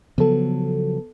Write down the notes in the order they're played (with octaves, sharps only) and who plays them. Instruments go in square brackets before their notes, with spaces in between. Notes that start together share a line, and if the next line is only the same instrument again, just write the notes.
[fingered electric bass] C#3 F3 F#3 [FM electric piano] B3 A4